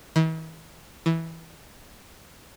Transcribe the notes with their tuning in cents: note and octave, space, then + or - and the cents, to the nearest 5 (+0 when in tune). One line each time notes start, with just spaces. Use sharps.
E3 -45
E3 -10